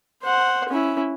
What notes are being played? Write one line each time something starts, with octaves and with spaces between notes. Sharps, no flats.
C5 F#5
C#4 E4